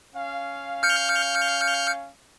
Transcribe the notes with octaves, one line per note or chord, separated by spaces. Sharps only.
C#4 F5
F6 G6 C#7